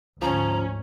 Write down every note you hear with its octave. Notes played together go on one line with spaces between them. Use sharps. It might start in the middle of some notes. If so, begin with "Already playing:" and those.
D2 G#2 F3 C#4 A#5